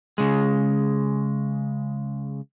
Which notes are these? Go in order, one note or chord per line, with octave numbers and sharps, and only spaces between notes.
C#3 G#3